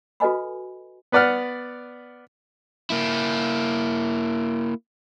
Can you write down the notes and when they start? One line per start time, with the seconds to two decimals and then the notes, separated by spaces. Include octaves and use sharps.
0.20 F#4 A4 B4 D#5 G#5 B5
1.12 B3 B4 D5 F#5 F6
2.90 A#3 E4